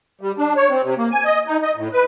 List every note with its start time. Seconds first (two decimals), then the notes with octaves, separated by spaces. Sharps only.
0.21 G3
0.38 D4
0.56 C#5
0.70 C4
0.84 C3
0.97 A#3
1.12 G#5
1.25 D#5
1.47 D#4
1.62 D#5
1.76 A2
1.93 B4